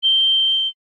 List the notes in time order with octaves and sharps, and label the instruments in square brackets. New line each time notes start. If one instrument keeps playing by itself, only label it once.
[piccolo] G7